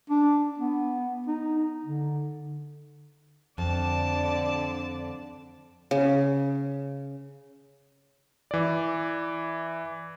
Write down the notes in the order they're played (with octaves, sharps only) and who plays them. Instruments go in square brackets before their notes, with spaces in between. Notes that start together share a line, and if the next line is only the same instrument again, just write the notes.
[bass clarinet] D4
B3
D#4
D3
[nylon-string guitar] F2 [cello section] D3 D5 [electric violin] A5
[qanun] C#3
[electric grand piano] E3 D5